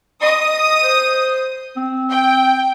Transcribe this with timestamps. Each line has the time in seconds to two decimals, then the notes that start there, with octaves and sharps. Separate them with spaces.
0.22 D#5 D#6
0.84 C5
1.77 C4
2.11 G5